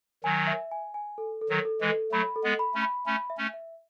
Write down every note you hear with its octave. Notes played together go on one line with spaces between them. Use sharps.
D#3 F#3 G#5
E5
G#5
G#5
A4
A4
D#3 F#3
A4
E3 G#3
A4
F#3 A3 B5
A4
G#3 B3
B5
A3 C#4
B5
A3 C#4 B5
E5
A3 C#4
E5